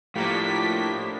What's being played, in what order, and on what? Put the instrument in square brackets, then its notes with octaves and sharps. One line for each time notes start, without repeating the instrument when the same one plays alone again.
[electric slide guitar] A2 [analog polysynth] F3 A#3 D4 [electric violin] G4 B6